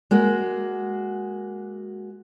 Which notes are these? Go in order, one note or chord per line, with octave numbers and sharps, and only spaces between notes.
G#3 A#3 F#4